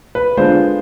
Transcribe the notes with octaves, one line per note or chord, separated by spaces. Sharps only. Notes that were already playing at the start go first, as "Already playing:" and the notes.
B4
D3 G#3 B3 D4 F4 C5